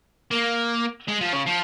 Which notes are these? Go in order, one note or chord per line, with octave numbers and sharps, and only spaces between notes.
A#3
G#3
F3
C#3
F3